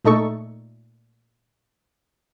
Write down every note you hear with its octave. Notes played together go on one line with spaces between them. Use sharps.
A#2 A3 D#4 A4 C#6